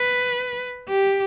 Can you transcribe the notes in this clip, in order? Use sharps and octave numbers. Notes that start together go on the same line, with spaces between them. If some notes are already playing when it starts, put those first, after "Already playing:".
Already playing: B4
G4